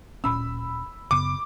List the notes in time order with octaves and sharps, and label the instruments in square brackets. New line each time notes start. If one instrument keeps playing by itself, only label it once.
[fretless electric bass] D1 A#2 C#4 [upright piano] B5 E6
[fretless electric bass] F#2 C#3 B3 [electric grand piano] D6